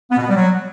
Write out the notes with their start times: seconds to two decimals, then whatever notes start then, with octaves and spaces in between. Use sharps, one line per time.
0.11 B3
0.17 B2
0.23 B3
0.29 G3
0.35 F#3